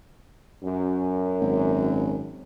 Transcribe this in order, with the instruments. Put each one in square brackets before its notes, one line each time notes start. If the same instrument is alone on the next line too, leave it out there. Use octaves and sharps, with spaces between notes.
[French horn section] F#2
[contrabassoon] G#1